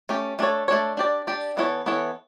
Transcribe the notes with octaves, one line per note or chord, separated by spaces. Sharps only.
A3 C#4 G4
A3 D4 A4 C#5
A3 D4 A4 C#5
D4 G4 D5
D4 G4 D5
E3 B3 E4 A4 C#5
E3 B3 E4 A4 C#5